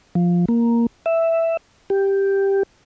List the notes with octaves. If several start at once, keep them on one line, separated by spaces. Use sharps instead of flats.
F3
A#3
E5
G4